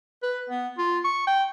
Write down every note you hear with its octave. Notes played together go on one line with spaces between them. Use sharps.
B4
B3
F4
C#6
G5